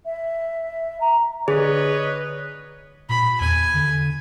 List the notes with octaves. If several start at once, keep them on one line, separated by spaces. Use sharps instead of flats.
E5
A#5
D3 G#4 B4 C#5 D#5
A#2 B5
E2 G#5
D3